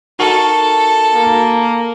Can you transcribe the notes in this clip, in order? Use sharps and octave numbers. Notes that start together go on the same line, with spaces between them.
D#4 F#4 A4 A#4
A#3